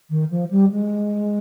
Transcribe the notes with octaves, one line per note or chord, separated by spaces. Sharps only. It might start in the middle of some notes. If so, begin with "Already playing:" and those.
D#3
F3
G3
G#3